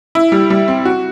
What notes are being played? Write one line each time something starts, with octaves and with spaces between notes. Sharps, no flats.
E4
G3
G3
C4
F#4